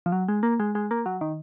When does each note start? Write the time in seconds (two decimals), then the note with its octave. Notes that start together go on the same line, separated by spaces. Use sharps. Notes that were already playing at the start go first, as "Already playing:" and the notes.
0.06 F3
0.12 F#3
0.28 G#3
0.43 A#3
0.60 G#3
0.75 G#3
0.91 A#3
1.06 F#3
1.21 D#3